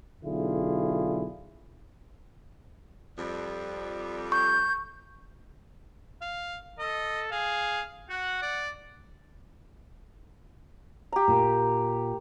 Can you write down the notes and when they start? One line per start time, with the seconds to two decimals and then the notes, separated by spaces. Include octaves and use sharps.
0.24 B1 D3 E4 F4 G#4
3.18 F2 G3
4.32 C#6 G6
6.21 F5
6.79 A4 D#5
7.31 G#4 F5
8.10 F#4 F#5
8.42 D5
11.12 G4 A#5
11.28 A#2